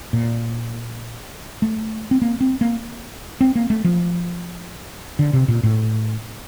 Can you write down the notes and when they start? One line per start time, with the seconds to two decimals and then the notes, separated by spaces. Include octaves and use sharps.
0.13 A#2
1.62 A3
2.11 C4
2.22 A#3
2.41 C4
2.61 A#3
3.41 C4
3.55 A#3
3.70 A3
3.84 F3
5.19 D3
5.33 C3
5.48 A#2
5.63 A2